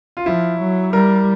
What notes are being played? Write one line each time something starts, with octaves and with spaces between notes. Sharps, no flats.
F4
F3 E4
F#3
G3 A#4